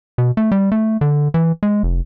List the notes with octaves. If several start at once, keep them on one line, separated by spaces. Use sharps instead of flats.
B2
A3
G3
A3
D3
E3
G#3
F1